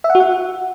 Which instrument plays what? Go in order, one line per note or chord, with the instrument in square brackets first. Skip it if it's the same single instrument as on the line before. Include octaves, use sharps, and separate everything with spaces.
[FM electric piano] E5
F#5
F#4
F#5